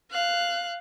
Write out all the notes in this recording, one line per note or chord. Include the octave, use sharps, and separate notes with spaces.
F5 F#6